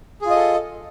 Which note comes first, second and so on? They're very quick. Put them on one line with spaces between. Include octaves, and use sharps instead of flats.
G#4 F4 D#5 A4